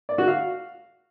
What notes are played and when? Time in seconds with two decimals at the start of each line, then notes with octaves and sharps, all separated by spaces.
0.09 D5
0.18 F#4
0.28 F5